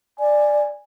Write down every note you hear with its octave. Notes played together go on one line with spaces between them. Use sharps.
D5 G#5